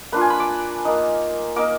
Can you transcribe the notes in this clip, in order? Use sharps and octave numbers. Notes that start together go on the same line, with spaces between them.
A#3 D4 F4 B4
G#5
B5
D6
A#3 D#4
A#3 D#4 D6